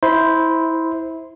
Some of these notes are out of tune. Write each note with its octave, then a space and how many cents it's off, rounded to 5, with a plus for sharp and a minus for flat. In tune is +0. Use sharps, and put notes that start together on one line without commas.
E4 -20 C5 +0 C6 -20